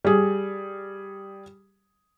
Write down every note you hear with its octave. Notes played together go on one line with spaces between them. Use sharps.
G3 G#4